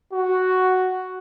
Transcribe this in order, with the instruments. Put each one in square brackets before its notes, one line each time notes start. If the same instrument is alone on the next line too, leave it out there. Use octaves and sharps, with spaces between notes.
[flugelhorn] F#4